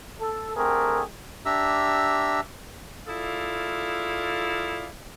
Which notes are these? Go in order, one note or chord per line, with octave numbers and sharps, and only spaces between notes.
A4
D3 A3 C4 G4 G#4 A#4
D4 G4 E5 A#5 E6
E4 F4 G#4 A4 D5 F5